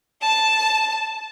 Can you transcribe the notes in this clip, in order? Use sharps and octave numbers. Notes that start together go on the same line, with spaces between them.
A5 E7